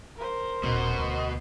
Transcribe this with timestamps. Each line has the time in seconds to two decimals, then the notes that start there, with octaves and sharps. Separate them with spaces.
0.16 A#4 C5
0.63 D#1 B2
0.99 D2